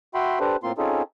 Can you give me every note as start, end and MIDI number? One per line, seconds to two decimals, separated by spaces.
0.14 0.39 66
0.14 0.39 76
0.14 0.39 79
0.14 0.39 83
0.14 0.39 84
0.40 0.56 62
0.40 0.56 67
0.40 0.56 69
0.40 0.56 71
0.40 0.56 72
0.63 0.72 45
0.63 0.72 58
0.63 0.72 60
0.63 0.72 65
0.63 0.72 84
0.78 1.02 60
0.78 1.02 61
0.78 1.02 63
0.78 1.02 65
0.78 1.02 68
0.78 1.02 69